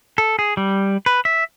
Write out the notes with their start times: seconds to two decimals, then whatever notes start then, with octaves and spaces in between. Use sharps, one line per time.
0.18 A4
0.39 G#4
0.57 G3
1.06 B4
1.25 E5